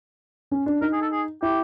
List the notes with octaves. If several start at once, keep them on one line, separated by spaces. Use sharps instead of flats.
C#4
D4
D#4 A#4
G#4
A4
G#4
E4 G4